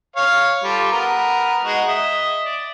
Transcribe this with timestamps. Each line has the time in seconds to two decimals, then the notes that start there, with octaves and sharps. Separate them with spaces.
0.16 C#5 F5
0.63 G3 F4 A4
0.92 B3 A#4 A#5
1.64 G#3 D#4 F#4
1.87 D#5 E5
2.45 D5